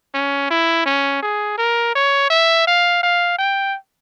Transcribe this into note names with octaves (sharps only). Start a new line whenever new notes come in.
C#4
E4
C#4
G#4
A#4
C#5
E5
F5
F5
G5